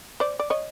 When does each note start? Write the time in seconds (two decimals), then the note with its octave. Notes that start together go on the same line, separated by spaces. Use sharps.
0.20 C5 D5
0.39 D5
0.50 C#5 D#5